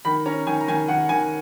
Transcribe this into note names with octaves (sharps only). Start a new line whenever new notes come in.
D#3 B5
C#4 A#5
D#3 G#5
A#5
D#3 G#5
D#3 F#5
D#3 G#5